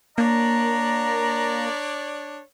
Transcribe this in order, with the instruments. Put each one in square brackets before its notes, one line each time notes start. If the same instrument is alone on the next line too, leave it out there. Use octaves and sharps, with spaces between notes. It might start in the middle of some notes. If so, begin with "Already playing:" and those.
[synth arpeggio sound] A#3 [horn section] D4 C#5 D5 [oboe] A#5